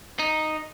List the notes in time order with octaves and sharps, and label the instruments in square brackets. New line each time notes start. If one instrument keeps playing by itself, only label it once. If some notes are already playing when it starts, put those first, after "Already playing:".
[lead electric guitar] D#4